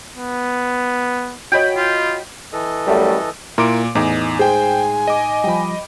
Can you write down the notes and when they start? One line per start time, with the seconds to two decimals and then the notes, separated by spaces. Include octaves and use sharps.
0.16 B3
1.52 F#4 C#5 D#5 G5 B5
1.76 F4
2.53 E3 A4 D#5
2.86 F#2 G3 A3
3.58 A#2 E4 A#4 C6 D6 D7
3.95 E2 A2 D#4 D#5 G#5 D6
4.39 G#3 G#4 C5 G5 G#5
5.07 D#5 D6
5.44 F3 G3 G5 B5